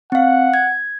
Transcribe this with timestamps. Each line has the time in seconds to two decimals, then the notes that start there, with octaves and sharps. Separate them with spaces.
0.12 C4 F5 F#5
0.54 G#6